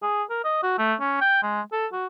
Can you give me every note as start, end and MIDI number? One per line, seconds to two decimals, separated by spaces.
0.02 0.23 68
0.29 0.42 70
0.44 0.59 75
0.63 0.75 66
0.78 0.94 57
1.00 1.18 61
1.21 1.41 79
1.42 1.61 56
1.72 1.87 69
1.92 2.06 66